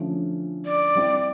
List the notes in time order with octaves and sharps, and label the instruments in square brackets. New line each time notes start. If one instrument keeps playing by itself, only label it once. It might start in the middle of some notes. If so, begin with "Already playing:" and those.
Already playing: [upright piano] D3 F3 A3 C#4
[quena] D5
[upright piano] G3 C4 E4